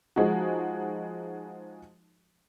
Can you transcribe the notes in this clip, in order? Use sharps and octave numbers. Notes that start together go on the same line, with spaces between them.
F3 G#3 D#4 F#4